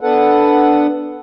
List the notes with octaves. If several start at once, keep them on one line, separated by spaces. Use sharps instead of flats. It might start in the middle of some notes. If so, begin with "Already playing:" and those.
B3 D4 A4 B4 F#5